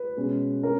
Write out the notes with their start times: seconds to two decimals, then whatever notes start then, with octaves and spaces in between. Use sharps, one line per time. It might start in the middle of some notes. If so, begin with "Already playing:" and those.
Already playing: B4
0.17 B2 G#3 C#4
0.63 C#4 A#4